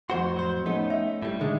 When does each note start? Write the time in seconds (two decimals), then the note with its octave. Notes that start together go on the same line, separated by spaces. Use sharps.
0.10 F2 A2 F#4 C5 C6
0.36 F#3 C5
0.66 A3 B3 C#4 D#4
0.90 E5
1.22 A2 G3
1.41 D3 D#3 G#3